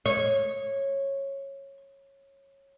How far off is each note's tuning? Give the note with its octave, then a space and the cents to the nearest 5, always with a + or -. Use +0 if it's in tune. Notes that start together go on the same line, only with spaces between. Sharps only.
C#5 -15